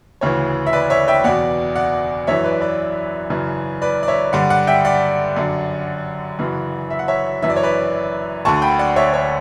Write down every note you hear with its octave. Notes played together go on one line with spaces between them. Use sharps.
D2 C#3 E3 C#5
E5
B4 D5
C#5 E5
E5 G5
E2 B2 D5 F#5
D5 F#5
F#2 E3 C#5 E5
B4 D5
B4 D5
F#2 C#3 E3
B4 D5
D5
C#5 E5
G2 D3 D5 F#5
D5 F#5
E5 G5
D5 F#5
F#2 D3
F#2 C#3 E3
E5
F#5
C#5 E5
F#2 E3 E5
D5
C#5
B4 D5
D2 D3 A5 C#6
G5 B5
D5 F#5
C#5 E5
C#5